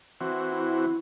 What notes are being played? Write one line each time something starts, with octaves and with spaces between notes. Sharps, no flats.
E3 C4 F#4
E4